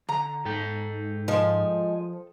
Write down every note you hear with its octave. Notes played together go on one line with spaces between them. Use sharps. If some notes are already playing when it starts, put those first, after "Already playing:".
D3 A#5
G#2 A4 G5
F3 G#3